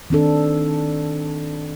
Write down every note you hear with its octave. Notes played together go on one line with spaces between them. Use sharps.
D#3 C4 D4 A4